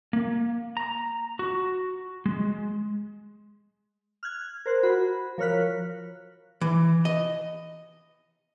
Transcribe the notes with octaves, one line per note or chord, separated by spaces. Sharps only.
A#3
A#5
F#4
G#3
F6 F#6 G#6
A#4 C5 F#6
F#4 B5
F3 A#4 C#5 F6 F#6 B6
E3
D#5